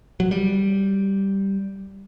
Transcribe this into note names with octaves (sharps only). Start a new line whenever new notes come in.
F#3
G3